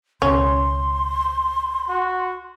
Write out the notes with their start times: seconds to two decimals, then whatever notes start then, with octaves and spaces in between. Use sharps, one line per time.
0.22 C#2 B2 C#4 C6
1.89 F#4